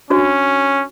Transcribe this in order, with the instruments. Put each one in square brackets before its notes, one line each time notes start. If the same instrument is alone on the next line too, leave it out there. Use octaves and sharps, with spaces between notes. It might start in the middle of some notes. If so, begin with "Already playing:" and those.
[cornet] C#4 [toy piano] D4 F#4 C#5